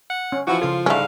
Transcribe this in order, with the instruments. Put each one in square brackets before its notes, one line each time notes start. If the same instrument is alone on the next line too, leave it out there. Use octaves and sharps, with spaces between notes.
[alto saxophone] F#5
[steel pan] C#4
[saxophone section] E3 F#4 [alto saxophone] F3 [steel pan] E4
[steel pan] C#3 A4 [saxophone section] F4
[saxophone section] G#2 D3 F5 [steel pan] G3 [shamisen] A3 C#4